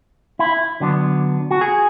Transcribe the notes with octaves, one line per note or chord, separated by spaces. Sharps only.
E4
D3 F#3 B3 D4
F#4
G#4